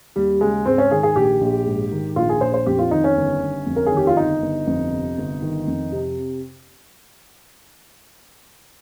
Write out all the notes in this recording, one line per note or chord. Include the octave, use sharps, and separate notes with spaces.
D#2 G3
C#3 G#3
G#2 C4
C#4
D#3 G#4
G#4
A#1 G4
A#1
G#2
D#3
A#1 F4
G#4
A#1 C5
C5
F2 G4
F4
D#3 D#4
C#4
G1
G1
F2
A#4
D#3 G#4
G4
F4
G1 D#4
G1
F2
C3
G1
D#3
F2
C3